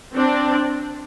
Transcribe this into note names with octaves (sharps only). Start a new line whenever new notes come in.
C4 D4